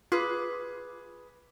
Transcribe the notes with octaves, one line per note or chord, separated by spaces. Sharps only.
F4 G#4 B4 D6